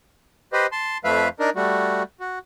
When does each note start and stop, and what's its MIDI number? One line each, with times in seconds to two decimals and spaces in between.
0.53 0.67 67
0.53 0.67 71
0.53 0.67 72
0.53 0.67 75
0.72 0.98 81
0.72 0.98 84
1.04 1.28 41
1.04 1.28 53
1.04 1.28 57
1.04 1.28 71
1.04 1.28 76
1.04 1.28 77
1.40 1.50 62
1.40 1.50 63
1.40 1.50 70
1.56 2.03 55
1.56 2.03 57
1.56 2.03 66
2.20 2.39 66